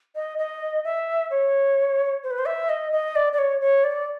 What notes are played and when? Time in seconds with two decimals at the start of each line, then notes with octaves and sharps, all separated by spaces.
0.15 D#5
0.38 D#5
0.84 E5
1.31 C#5
2.23 C5
2.30 B4
2.39 C5
2.46 E5
2.69 D#5
2.92 D#5
3.15 D5
3.33 D5
3.38 C#5
3.61 C#5
3.84 D5